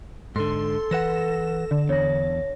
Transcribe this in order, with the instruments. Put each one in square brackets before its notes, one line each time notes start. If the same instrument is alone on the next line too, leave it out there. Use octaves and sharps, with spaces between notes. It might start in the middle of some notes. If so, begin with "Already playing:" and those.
[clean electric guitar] G#2 D3 [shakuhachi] A4 [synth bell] C6
[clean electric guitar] E3 B4 F#5 [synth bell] A#6 E7
[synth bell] D3
[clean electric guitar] E2 [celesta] C#5 A#6